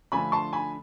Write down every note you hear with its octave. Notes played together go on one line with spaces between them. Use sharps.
D3 F3 A3 D4 G#5 B5
A5 C6
G#5 B5